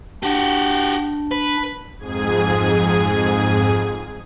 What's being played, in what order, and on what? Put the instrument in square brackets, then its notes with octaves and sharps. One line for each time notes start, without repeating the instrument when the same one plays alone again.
[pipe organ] D4 [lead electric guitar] F#4 G4
[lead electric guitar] B4
[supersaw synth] F2 G#2 G#4 G#6 D#7